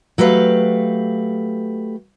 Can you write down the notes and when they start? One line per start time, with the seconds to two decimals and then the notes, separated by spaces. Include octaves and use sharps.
0.18 F#3 A3 G4 B4 F5